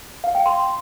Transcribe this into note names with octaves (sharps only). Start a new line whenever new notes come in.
F5
G5
C6